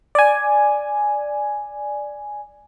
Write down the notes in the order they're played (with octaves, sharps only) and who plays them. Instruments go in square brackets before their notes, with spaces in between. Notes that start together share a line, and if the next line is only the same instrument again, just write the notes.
[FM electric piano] D5 G#5